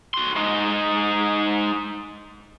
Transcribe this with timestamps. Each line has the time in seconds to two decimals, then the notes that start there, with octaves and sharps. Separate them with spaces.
0.14 F#4 C6
0.36 G#3 D#4